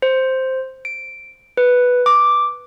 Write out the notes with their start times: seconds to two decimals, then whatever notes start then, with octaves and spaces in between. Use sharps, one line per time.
0.02 C5
0.85 D7
1.57 B4
2.06 D6